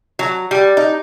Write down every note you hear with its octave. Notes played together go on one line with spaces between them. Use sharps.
F#3
G3
D#4